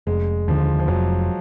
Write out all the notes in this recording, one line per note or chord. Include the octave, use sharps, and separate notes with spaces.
F1 G#3
D#2 D3 F3
F3
F1 F#3